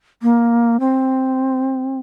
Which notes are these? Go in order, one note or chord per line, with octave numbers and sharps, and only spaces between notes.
A#3
C4